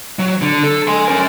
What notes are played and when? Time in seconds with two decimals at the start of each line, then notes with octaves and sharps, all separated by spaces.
0.19 F#3
0.42 D3
0.63 A4
0.87 G#5 C6
1.08 C#4 A#4